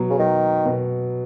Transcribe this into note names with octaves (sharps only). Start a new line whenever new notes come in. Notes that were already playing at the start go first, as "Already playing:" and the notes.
Already playing: B2 F#3
C#3
D#3 F#3
B2